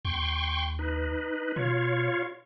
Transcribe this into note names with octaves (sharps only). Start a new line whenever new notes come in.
D#2 G5 C6 C#6
D#4 B4
B2 F4 C#5